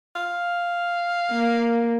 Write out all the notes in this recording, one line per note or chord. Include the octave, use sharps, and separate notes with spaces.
F5
A#3